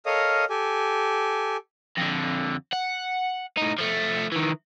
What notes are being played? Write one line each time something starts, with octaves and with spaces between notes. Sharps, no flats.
A4 A#4 C#5 D#5 F5 D#6
G4 A4 G#5
F2 D3
F#5
A2 D#4
F3 A3
D#3 E3